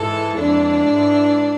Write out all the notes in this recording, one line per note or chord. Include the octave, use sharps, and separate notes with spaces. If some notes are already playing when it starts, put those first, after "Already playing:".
Already playing: G#2 E3 G#3 A4
F2 E3 G#3 D4
G#2 E3 G#3